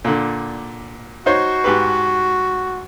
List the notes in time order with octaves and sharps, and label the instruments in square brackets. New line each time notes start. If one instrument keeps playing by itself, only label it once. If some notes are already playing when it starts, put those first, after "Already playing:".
[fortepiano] A#2 D3
[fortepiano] D#4 C5 C#5 [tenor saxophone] F#4
[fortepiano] G#2 G4 B4